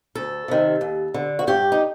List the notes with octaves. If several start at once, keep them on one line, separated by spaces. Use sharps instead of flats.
D2 A4
C3 D#3
D#2
D3
F#4
G2 G4
D#4